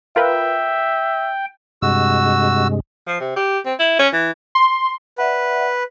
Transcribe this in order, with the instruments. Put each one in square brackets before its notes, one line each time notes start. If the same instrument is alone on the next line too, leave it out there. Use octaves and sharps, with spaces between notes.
[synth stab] F4 A#4 B4 [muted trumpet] E5 [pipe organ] G5
[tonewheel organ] G2 C3 G#3 [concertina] F#4 E6
[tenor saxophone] F3
C3
G4
C4
E4
C#4
E3
[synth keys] C6
[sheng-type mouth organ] B4 [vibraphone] D5 E5 F#5